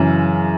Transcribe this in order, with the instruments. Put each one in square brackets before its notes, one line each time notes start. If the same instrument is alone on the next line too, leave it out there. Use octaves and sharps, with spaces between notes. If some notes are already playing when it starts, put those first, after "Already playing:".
Already playing: [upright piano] F#2 C#3 E3